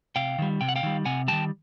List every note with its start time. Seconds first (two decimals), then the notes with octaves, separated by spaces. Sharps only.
0.16 C3 F5 G5
0.38 D#3 G3
0.61 C3 G5
0.68 F#5
0.76 F5 G5
0.83 D#3 G3
1.05 C3 F#5 G#5
1.28 D#3 G3 G5 A5